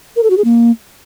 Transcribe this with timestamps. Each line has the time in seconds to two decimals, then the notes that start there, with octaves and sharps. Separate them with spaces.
0.16 A#4
0.23 A4
0.30 F#4
0.37 G#4
0.44 A#3